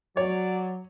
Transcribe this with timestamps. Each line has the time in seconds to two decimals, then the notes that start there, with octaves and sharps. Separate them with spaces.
0.17 F#3 C#5 D5